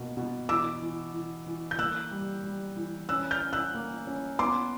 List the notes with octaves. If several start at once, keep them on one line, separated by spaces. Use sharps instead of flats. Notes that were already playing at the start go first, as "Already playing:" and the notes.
Already playing: B2 A#3
B2
E3 D6 E6
E3
E3
E3
G6
A#3 E6 F#6
G3
G3
E3
C#4 E6 F#6
F6 G6
C#4
E6 F#6
A#3
C#4
B3 C6 D6